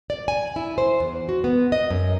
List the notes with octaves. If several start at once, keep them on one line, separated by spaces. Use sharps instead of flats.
D5
G#5
E4
C5
E2
F#4
B3
D#5
F#2